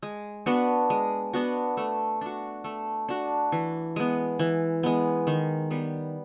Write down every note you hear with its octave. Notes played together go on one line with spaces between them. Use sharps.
G#3
B3 D4 F#4
G#3
B3 D4 F#4
A3
D4 F#4
A3
D4 F#4
E3
G#3 B3
E3
G#3 B3
D#3
G3 B3